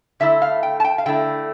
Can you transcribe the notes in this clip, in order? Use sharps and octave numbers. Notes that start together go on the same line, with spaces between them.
D3 A3 E4 E5
F5
G5
A5
G5
F5
D3 A3 E4 G5